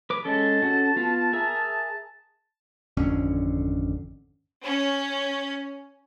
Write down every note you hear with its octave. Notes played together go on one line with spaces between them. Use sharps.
B4 D6
G#3 C#4 A4 A5
C#4 F#4 A4
B3 F4
G#4 A#4 E5
G#1 F2 D3 C#4
C#4